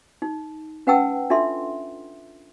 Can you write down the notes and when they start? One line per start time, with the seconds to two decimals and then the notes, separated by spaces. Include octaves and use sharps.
0.22 D#4
0.87 C#4 B4 F#5 G5 A5 E6
1.30 D4 F4 A4 E5 C6